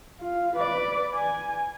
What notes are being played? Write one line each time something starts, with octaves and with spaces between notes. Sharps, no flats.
F4
B4 D5
G#5